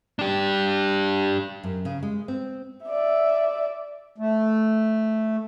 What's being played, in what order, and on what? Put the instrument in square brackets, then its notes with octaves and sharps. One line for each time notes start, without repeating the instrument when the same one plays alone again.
[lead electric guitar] D4 G4
[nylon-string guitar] F#2
C#3
G#3
C4
[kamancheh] D5 E5
[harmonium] A3